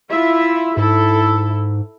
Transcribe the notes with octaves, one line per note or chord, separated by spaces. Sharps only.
E4 F4 E5
G#2 E4 A4